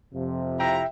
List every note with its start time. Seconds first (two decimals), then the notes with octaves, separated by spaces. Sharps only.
0.14 F2 C3 F3
0.60 E4 E5 G5 A#5